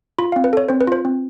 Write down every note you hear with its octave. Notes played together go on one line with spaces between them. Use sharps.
F4 B5
F5
C4
B4
A4 C#5
C4 C5
B4
F4 C5
C4